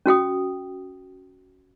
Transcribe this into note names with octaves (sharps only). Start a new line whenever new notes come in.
C#4 F#4 G5 D#6